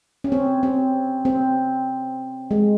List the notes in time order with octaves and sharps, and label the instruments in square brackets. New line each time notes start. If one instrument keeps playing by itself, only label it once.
[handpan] C#4
C4
C4
C4
G#3